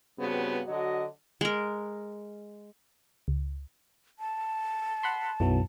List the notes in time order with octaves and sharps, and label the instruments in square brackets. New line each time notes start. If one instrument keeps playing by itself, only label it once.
[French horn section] G2 C#3 B3 C4 F#4
D3 F#3 F#4 D#5
[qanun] G#3 A#4
[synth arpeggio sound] C#2
[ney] A5
[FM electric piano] F#5 B5 C6
[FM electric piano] B1 E3 F#3 [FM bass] F#2